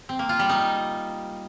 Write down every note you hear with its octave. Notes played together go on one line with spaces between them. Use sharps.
C4
A#3
F4
G3
D#4